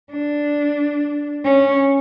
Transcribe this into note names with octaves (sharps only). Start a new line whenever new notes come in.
D4
C#4